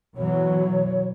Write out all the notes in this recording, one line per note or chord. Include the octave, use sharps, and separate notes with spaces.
B2 E3 F#3 C#5